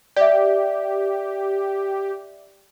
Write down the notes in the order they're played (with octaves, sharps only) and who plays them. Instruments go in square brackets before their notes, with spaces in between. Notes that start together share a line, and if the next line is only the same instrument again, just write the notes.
[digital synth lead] G4 [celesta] D5 E5